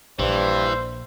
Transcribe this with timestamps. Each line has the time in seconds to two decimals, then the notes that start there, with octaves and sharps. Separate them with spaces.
0.19 A#1 G2 E3 C5